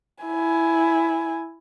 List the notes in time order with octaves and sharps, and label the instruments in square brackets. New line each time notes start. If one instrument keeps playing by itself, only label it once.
[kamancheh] E4 G#5